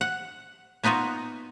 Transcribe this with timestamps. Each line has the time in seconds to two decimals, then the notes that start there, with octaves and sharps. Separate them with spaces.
0.01 F#5
0.84 A#3 B3 D#4 F4 F#4